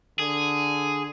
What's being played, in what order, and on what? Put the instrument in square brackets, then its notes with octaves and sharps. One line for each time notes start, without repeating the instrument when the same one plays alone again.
[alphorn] D3 [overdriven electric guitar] G#4